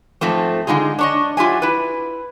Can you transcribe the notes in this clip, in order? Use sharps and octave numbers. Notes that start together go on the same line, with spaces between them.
G#2 F3 A3 C4
D3 G#3 D#4 F4 G#4
D4 C#5 D#5
F#3 F4 G4 E5 G#5
E4 B4